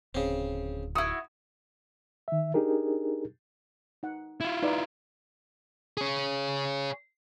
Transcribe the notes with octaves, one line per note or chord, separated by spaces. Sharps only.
D1 C#3 C4
E4 F#4 D#6
D#3 E5
D4 D#4 G4 G#4 A#4
D#4 F#5
E4 F4
D#4 B4 D5
G#4 C#5